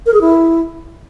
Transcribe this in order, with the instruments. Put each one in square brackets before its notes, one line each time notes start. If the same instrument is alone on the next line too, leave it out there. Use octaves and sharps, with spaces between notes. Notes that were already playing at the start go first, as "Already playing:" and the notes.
[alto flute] A#4
G#4
E4